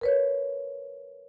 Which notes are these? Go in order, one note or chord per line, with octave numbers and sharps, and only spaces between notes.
A#4 B4 C#5